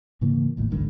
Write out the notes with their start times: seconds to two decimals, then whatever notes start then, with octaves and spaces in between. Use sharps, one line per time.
0.21 G#2 C#3 E3 A#3
0.57 A1 D#2 A2
0.70 G#1 D2 G2 D3